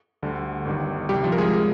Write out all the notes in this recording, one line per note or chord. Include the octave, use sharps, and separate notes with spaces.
D2 D3 G3
G1 G2 D#3 G3
C2 C3 G3 G4
F3 F4
A#4
G#3 G#4
D3